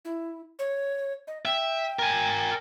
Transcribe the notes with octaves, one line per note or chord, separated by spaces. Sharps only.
E4
C#5
D#5
E5 G5
A#4 G#5